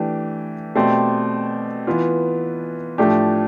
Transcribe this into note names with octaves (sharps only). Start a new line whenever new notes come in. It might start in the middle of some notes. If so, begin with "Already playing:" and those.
Already playing: E3 A3 D4 G4
B2 A3 C4 G4 D5
E3 B3 F4
A2 F3 A3 D4 G4